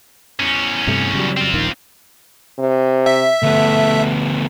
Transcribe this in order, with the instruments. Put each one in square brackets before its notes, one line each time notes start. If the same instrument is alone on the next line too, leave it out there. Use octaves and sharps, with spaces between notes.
[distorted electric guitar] E2 C#4
[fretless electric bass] G2 C3 A3
C#3 F#3 G3
[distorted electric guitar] C4 F4
[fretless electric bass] D#1 A#1 D#3
[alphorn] C3
[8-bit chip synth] E5
[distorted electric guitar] D2 B3 [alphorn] A3